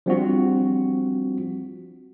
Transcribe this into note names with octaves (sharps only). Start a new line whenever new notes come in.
F3 G3 C4 D4 F4 F#4